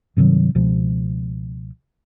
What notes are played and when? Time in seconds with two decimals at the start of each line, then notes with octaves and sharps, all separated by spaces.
0.16 G2 C3 D#3 F#3
0.55 C#2 B2 F3